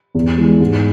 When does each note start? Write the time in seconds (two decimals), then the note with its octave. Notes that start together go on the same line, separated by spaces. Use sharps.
0.15 E2
0.38 E3 G#3
0.60 G#2